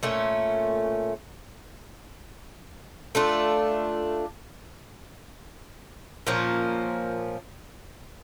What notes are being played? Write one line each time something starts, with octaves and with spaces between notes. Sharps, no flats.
A#2 A3 C#4
A3 D4 F4
A#2 F3 A#3 C#4